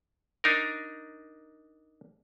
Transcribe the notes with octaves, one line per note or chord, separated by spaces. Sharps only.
D4 D#4 A#4